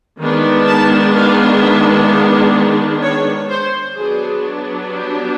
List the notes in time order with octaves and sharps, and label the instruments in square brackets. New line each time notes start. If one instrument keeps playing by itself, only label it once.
[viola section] D#3 G#3 B3 D4
A5
F5
E5
F5
C#5
C5
F#3 B3 D4 G#4
G4